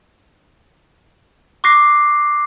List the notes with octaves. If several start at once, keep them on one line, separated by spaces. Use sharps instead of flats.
C#6 D6 F#6 A#6 C7